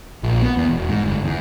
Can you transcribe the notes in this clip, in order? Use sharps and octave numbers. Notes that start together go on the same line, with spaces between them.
A#1
B3
E2
E1
G#2
G1
E2